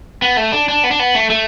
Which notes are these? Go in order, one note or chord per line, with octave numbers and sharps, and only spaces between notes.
B3
A3
D4
D4
B3
D4
B3
A3
A3